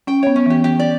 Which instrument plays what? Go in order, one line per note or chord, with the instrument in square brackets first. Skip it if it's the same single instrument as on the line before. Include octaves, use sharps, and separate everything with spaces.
[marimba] C#4 [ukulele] G5
[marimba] B3 [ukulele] C#5
[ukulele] C#4
[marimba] E3 [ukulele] G4
[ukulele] G4
D5